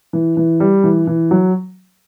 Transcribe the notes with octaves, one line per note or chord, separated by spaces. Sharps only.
E3
E3
G3
E3
E3
F#3